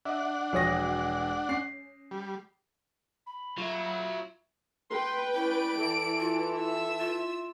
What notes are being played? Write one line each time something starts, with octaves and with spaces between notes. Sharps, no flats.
D4 D#5 E5 F#5
E1 F3 F#4 C#5 D#6 A#6
C#4 C7
G3
B5
F#3 F4 E5
B4 G5 C6
C#4 E4 D5 D7
E3 A4
F4
E5 E6
F4